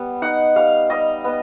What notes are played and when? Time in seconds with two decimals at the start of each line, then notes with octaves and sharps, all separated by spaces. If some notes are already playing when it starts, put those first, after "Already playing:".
Already playing: G3 B3
0.22 D#4 F#5
0.56 G3 F5
0.90 G3 D#5
1.24 B3